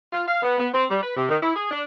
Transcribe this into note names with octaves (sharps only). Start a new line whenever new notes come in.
F4
F5
B3
B3
C4
G3
B4
C3
D#3
E4
G#4
D4